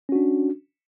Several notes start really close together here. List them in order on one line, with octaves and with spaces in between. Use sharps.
C#4 F#4 D4